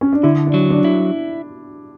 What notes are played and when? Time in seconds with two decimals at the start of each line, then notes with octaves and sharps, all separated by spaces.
0.01 C#4
0.13 D4
0.23 D3 E4
0.47 D4
0.54 F#3
0.70 D4
0.84 E4